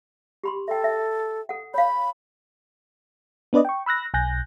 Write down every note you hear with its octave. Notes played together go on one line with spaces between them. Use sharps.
G4 B5 C6
A4 E5 G5
E5
A4 F#5
C#5 F5 B5
B3 D4 B4 D5 D#5
G5 C#6
B5 E6 F#6 A#6
B1 G#5 F#6 G6 A#6